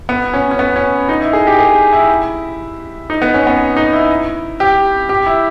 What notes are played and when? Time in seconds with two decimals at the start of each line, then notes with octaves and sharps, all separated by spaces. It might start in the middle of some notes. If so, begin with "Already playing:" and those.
0.09 B3
0.34 C#4
0.51 C#4
0.59 B3
0.76 C#4
1.09 D#4
1.21 E4
1.33 G#4
1.47 G4
1.59 G#4
1.93 E4
3.10 D#4
3.22 B3
3.34 C#4
3.47 B3
3.76 D#4
3.93 E4
4.60 G4
5.09 G4
5.26 E4